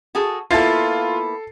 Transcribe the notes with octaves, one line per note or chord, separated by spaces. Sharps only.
F#4 G#4 A4
A#3 B3 E4 F4 A4 A6 C7